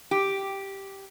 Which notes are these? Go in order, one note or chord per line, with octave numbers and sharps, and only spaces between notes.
G4